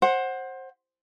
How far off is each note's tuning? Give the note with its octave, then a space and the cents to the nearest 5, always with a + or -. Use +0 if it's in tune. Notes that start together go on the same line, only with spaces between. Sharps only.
C5 +20 F#5 +0